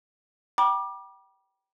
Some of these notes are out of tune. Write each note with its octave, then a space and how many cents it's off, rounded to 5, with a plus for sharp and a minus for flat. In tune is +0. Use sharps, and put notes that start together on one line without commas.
G5 -20 B5 -40 D6 +20